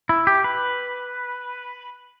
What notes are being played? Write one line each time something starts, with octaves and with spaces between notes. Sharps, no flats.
E4
G4
B4